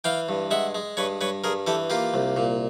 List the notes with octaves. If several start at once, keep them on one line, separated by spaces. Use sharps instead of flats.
E3 F5 G5
G2
G#3 E5 F#5
G#3
G2 B4 C#5
G2 B4 C#5
G2 G#4 A#4
E3 G4 A4
A#3 F4 G4
C2
A#2